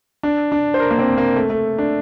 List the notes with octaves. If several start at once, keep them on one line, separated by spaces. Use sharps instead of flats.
D4
D4
C5
A#4
A#3
C4
A#3
A3
A3
D4